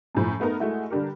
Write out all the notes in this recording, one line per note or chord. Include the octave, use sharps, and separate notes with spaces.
F#2 A2 F3
A3 B3 D#4 A#4
G#3 A3 E4 F#4
D3 G3 D4 G4 A#4